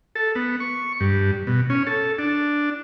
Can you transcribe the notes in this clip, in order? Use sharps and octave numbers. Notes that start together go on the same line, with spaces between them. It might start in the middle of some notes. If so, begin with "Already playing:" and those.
A4
B3
C#6
G2
B2
C#4
A4
D4